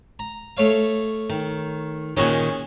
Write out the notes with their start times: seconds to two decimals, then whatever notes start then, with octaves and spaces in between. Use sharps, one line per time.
0.19 A#5
0.57 A3 C#5 F5
1.30 D#3
2.17 A#2 D#3 C#4 F#4 G#4